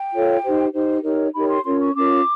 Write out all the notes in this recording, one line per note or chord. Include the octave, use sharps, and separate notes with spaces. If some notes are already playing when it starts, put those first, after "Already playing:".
Already playing: G5
F4 A4 C#5
D#4 G4 C5
D#4 G4 C5
D#4 G4 A#4 C#5
D#4 G4 A#4 C#5 B5
C6
C#4 F4 A#4 C#5 C6
C#6
C#4 F4 A#4 C#5 D6